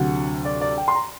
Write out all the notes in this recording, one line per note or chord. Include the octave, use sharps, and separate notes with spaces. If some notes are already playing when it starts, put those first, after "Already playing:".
Already playing: D2 C3 F#3 F#5
D5
D5
G5
C6
A#5